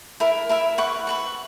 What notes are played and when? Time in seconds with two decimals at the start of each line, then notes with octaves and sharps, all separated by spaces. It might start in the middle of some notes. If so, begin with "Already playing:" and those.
0.20 E4 A#4 E5
0.49 E4 A#4 E5
0.78 B4 F#5 C#6
1.07 B4 F#5 C#6